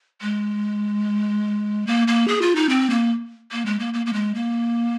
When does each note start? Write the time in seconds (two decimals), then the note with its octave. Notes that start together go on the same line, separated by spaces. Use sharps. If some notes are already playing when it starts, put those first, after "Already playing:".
0.22 G#3
1.87 A#3
2.08 A#3
2.28 G#4
2.42 F4
2.56 D#4
2.69 C4
2.90 A#3
3.52 A#3
3.66 G#3
3.79 A#3
3.94 A#3
4.06 A#3
4.13 G#3
4.35 A#3